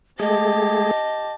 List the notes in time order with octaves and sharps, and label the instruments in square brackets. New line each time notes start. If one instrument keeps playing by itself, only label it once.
[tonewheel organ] G#3 A3 G#4 [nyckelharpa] G4 A5 [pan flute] D#5